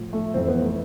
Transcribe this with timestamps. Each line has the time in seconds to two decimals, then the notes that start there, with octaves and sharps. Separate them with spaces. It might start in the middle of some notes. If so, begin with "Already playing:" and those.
Already playing: A2 F3
0.13 A3
0.34 F2 E3 C4
0.48 B3
0.62 A3